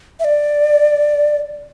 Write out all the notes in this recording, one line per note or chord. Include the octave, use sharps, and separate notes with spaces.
E5
D5